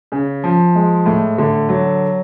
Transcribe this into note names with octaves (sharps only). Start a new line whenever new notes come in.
C#3
F3
G#3
A2
D3
F#3